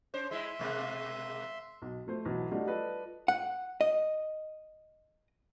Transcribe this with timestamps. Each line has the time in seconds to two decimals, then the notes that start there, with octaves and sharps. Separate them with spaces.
0.14 C#4 C5
0.31 G#3 E4 E5 C6
0.59 B2 G#3 A#3
1.82 B1
2.07 F3 A3 C5
2.25 B1 E3 F#3
2.51 G3 A3 D4 D#4 F4 F#4
2.67 F4 A4 B4 D5 D#5
3.28 F#5
3.81 D#5